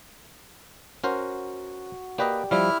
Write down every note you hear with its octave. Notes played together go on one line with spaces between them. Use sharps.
C#4 F#4 A#4 C5
A#3 G4 B4 D5 D#5
F3 G3 E4 D5 F6